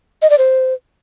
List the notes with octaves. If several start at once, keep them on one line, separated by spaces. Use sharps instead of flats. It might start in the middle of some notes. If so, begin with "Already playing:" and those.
D#5
D5
C5